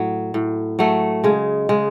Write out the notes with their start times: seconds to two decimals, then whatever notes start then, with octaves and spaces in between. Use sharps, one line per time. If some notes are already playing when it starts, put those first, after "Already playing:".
Already playing: A2 F#3
0.34 A2
0.79 F#3 A3
1.24 C#3 G#3
1.69 C#3 G#3